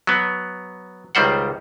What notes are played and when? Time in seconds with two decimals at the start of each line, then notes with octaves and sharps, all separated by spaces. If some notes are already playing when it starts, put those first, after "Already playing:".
0.07 F#3 B3
1.15 C#2 D#3 G3 C5 F#5